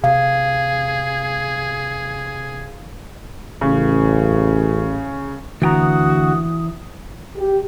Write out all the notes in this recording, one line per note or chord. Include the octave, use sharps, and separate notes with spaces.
C3 G#4 F5
A1 C#3
D2 E3 F#4 G5 A#5 D#6
G4